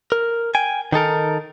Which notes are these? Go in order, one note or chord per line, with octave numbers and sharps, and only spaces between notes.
A#4
G5 G#5
D#3 D#4 A4 A#4